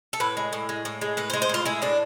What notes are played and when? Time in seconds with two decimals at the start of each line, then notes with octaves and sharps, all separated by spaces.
0.13 A4
0.20 A2 B4
0.37 G#3
0.53 A2
0.69 G#3
0.85 A2
1.01 G#3
1.17 A2 B4
1.30 C5
1.33 G#3
1.42 C5
1.49 A2 F4
1.65 G#3 E4
1.82 A2 D4